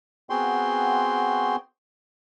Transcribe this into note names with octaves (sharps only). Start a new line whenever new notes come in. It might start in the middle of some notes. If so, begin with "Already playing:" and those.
B3 C4 F#4 G#4 G5 C6